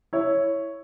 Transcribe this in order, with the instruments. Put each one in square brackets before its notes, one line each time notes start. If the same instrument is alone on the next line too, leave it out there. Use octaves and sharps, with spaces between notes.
[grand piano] E4 C#5